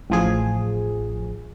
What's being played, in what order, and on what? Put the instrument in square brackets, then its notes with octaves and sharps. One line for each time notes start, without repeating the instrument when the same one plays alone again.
[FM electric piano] A1 F3 G#4